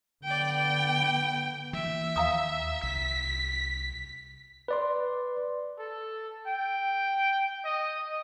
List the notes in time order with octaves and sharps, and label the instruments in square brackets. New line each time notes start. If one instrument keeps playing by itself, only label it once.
[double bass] D3 B3 [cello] D5 G5
[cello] G5
[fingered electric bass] E3 A#3 [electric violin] E5
[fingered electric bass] D#2 [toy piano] F5 A#5 D#6
[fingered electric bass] C2 [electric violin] B6
[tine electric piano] B4 D5 C6
[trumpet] A4
G5
D#5